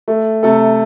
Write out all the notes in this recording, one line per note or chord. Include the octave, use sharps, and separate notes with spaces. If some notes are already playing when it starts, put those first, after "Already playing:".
A3
C3 A3 A4